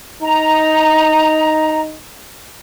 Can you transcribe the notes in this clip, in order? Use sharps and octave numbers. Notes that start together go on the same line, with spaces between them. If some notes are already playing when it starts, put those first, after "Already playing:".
D#4 A#5